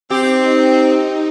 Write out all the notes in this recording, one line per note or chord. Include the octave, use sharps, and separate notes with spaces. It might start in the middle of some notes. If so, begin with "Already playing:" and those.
C4 D#4 G4